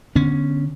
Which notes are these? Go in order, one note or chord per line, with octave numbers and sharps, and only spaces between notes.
D3 B3 C#4